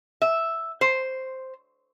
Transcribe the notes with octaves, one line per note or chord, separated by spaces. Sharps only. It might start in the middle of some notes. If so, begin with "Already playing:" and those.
E5
C5